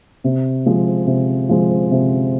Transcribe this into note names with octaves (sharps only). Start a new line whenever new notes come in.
C3
F3 G#3
C3
F3 G#3
C3